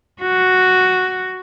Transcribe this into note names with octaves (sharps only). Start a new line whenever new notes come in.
F#4